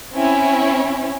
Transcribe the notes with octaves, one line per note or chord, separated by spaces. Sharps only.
C4 C#4 E4